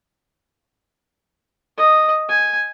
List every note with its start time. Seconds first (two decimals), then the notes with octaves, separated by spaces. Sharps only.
1.77 D#5
2.29 G#5